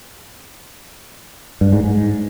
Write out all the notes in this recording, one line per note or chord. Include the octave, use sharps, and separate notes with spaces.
G2
G#2
G#2